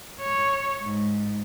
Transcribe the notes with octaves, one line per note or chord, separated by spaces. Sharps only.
C#5
G#2